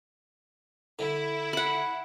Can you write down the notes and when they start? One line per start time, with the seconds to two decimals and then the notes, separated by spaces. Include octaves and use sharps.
0.99 D3 E4
1.53 F#5 B5